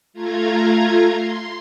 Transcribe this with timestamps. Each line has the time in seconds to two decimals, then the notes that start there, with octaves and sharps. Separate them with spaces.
0.13 A3 F4 A#5 G#6
1.08 C6